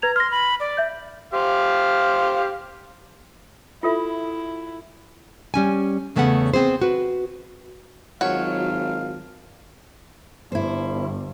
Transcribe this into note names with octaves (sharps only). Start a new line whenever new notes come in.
B4 A#5 G#6 F7
C6 F6 A#6
B5
D5
E5 G6
G4 C5 F5
E4 F4 A4 E5
G3 C#4 G#5
E2 C#3 A3 B3 C#4 F#5
B3 C4 G#4 C5
F#4 B4
G#1 D#3 F#3 F4 F#4 C#5 F5
G1 G2 E4 C5